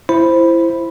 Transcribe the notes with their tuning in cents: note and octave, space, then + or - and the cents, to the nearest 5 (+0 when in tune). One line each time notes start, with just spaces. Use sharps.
E4 +20 C5 +0 B5 +0